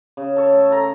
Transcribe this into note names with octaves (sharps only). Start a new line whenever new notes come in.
C#3
A4 C#5
A3
A4 A#5